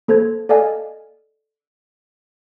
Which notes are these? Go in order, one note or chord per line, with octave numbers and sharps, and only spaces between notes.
A#3 A4 C5 G#6
A4 D5 D#5 F5 G#5